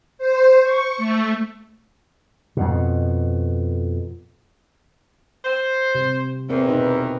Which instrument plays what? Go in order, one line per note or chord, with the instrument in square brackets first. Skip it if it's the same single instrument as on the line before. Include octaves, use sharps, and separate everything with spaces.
[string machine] C5
C#6
A3
[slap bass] F2 B2
[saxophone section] C5
[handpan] C3
[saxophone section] E2 [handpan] C4 A#4
[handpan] B2 D#4 B4